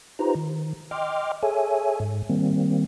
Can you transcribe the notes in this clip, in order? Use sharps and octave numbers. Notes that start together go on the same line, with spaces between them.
D#4 F4 G4 B4 C5 A#5
D#3
D#5 G5 C6 D6 F6
G#4 A4 C#5 E5 G#5
G#2
D#3 G3 A#3 C4